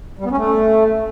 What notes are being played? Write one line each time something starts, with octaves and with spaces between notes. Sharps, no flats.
G3
B3
C#4
A3